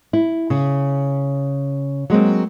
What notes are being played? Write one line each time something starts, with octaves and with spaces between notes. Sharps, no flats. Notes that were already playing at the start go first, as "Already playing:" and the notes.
E4
C#3
F#3 G#3 A#3 C4